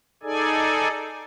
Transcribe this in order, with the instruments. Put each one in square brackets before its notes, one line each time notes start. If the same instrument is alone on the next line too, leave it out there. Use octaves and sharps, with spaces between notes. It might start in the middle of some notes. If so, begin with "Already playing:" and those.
[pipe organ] D#4 G#4 A4 D5 G#5